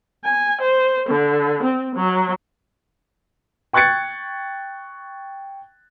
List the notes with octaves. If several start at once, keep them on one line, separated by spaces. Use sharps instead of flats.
G#5
C5
D3
C4
F#3
G5 C#6 F#6 G#6 A6 C#7